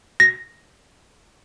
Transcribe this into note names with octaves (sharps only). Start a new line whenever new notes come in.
A#6